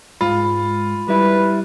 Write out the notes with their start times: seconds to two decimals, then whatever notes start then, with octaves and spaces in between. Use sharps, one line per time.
0.21 G#2 G#3 F4 B5
1.08 G3 E4 B4